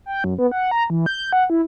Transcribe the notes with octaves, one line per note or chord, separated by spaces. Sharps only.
G5
F#2
B3
F#5
A#5
E3
G6
F#5
E4